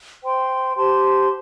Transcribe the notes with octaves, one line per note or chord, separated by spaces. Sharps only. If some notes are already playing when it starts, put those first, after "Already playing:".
C5 G5 C6
G4 C5 A5 C6